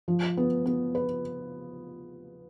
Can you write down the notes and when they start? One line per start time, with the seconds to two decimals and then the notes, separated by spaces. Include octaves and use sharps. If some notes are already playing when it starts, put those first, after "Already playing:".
0.08 F3
0.37 B3
0.66 B3
0.95 B4